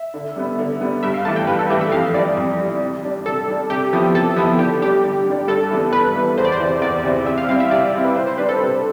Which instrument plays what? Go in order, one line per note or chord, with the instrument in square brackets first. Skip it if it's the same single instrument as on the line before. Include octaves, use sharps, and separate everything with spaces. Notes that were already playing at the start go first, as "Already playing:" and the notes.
Already playing: [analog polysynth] E5
[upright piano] D3
G3 B3
D3
G3 B3
[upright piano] G2 [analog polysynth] E5
[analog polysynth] F5
[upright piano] E3 A3 [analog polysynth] A5
[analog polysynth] G5
[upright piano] G2 [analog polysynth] B4
[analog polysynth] A4
[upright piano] E3 A3 [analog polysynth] G4
[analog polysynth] E5
[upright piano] F2 [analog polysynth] F5
[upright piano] E3 G3 [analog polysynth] D5
[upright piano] F2
E3 G3
C3
G3 D4
[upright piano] C3 [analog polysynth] A4
[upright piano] G3 D4
[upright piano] C3 [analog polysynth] G4
[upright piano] F3 B3 E4
[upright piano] C3 [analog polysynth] A4
[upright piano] F3 B3 E4
[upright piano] D3 [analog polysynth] G4
[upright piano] G3 D4 [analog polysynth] G4
[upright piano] D3
G3
D4
[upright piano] G2 [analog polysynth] A4
[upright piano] E3 G3 B3
[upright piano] G2 [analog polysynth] B4
[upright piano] E3 G3 B3
[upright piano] E2 [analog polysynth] C5
[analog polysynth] D5
C5
[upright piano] C3 E3
[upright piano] E2 [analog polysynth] D5
[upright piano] C3 E3
[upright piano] C3 [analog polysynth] E5
[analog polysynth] F5
[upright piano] G3 C4 E4 [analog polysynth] F5
[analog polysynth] E5
[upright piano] C3 [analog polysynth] D5
[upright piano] G3 C4 E4
[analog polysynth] B4
[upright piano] C3 [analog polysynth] C5
[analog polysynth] C5
[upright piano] G3 D4 [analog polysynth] B4
[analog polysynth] A4
[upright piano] C3